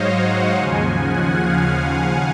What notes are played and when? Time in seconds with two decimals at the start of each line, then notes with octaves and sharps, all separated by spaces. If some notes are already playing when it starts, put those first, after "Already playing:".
Already playing: G#2 F#3 C5 C#5 D#5 F5
0.15 F#5
0.57 D#2 C#3 F3 G#5
0.99 F#5
1.41 F5